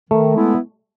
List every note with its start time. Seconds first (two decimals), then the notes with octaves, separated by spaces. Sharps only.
0.10 D#3 A3
0.34 G#3 B3 E4